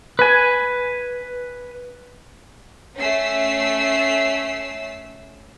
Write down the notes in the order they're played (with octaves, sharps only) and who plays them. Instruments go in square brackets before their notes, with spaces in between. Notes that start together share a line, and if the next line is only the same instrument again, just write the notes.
[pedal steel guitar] B4 G#5
[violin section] A3 C#4 E6 C7